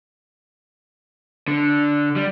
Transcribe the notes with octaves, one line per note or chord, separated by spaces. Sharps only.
D3
G3